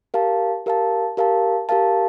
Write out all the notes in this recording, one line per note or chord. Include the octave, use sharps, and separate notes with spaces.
G4 A#4 F5 A5
G4 A#4 F5 A5
G4 A#4 F5 A5
G4 A#4 F5 A5